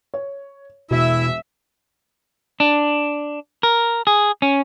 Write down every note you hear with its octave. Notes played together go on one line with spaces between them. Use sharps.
C#5
E1 B2 E4 E5
D4
A#4
G#4
C#4